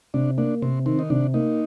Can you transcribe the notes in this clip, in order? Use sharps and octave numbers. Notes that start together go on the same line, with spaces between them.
C3 D4
A#3 D4
C3 C4
D#3 C4
D#4
C3 D4
A#3 D#4